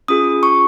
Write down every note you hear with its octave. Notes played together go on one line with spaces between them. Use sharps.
C#4 F4 G#4 D#6
C#6